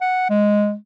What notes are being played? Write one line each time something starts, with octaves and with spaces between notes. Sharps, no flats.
F#5
G#3